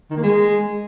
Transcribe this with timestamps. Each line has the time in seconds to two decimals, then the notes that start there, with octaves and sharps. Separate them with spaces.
0.10 D#3
0.17 A#3
0.23 G#3